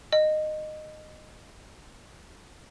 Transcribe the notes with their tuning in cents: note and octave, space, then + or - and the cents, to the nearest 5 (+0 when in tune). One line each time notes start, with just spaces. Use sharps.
D#5 -15